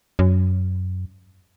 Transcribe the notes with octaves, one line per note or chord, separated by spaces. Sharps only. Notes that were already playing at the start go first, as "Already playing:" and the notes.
F#2